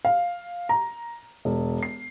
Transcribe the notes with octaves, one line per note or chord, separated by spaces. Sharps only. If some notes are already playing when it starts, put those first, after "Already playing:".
F5
A#5
E1
C7